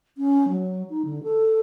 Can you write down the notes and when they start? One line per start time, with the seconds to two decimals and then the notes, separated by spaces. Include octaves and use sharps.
0.17 C#4
0.48 F#3
0.89 D#4
1.04 D3
1.23 A4